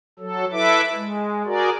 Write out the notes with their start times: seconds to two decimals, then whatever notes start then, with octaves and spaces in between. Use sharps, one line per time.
0.19 F#3 A4
0.52 E4 A4 B4 E5 D6
0.94 G#3
1.46 F#4 G#4 A#4 D5